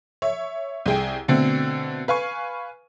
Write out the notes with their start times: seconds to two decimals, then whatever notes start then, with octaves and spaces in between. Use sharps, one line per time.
0.22 C#5 E5
0.86 C2 G#4 G5
1.28 B2 D3 A3 C4
2.08 B4 F5 G#5 C#6